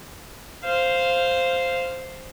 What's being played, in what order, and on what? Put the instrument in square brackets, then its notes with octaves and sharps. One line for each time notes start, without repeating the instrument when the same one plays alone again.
[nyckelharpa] C5 F5